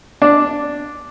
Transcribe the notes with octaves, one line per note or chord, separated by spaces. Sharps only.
D4